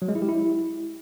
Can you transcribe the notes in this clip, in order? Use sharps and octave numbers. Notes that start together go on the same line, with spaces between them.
F#3
G#3
E4
G4
E4